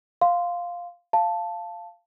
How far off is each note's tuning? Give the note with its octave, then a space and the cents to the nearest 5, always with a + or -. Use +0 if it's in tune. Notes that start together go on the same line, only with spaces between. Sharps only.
F5 +5 C6 -10
F5 -10 A5 +0